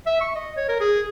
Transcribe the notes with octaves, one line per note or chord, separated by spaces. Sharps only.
E5
C#6
D#5
C#5
A#4
G#4